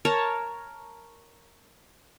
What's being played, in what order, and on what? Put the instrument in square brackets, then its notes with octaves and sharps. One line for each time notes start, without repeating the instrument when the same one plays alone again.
[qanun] A#4 C#5 A5